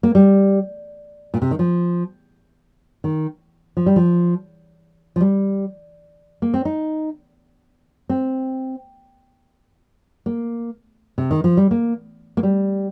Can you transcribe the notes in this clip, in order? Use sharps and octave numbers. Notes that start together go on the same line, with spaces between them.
A#3
G3
A#2
C3
D#3
F3
D#3
F3
G3
F3
F3
G3
A#3
C4
D#4
C4
A#3
C3
D#3
F3
G3
A#3
A#3
G3